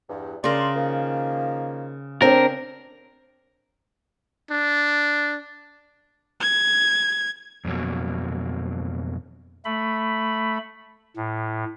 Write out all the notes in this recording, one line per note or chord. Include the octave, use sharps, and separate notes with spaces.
E2 G2
C#3 D4 A#4 D5 C6
D#3 F3 A#3
C4 D4 A#4
D4
G#6
F2 B2 F#3 A#3
A3 B5
A2